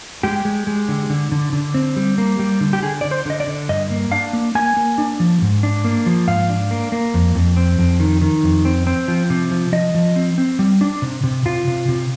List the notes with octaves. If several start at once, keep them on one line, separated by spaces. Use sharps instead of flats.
G#3 G4
G#3
G#3
D3
D3
D3
D3
C4
G3
A#3
G3
D3
G4
D3 G#4
D3 D5
C5
D3 D#5
D5
D3
G2 D#5
A#3
D4 F5
A#3
A#3 G#5
A#3
D4
F3
G#2
D4
A#3
F3
G#2 F5
D4
A#3
A#3
F2
F2
C4
F2
D#3
D#3
F2
C4
C4
F3
C3
F3
F3 D#5
F3
C4
C4
G3
D4
C3
C3
C3 F4
C3
C3